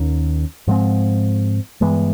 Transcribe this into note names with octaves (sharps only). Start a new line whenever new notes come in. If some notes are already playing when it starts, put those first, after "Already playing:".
Already playing: D#2 D#3 C#4
G#2 F3 G#3 C4
G2 E3 G#3 B3